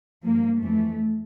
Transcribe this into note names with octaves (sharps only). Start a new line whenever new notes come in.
G2 F3 A#3
F2 E3 A3